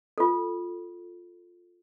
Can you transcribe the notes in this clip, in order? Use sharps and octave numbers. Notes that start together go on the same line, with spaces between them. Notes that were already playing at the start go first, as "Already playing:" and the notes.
F4 A4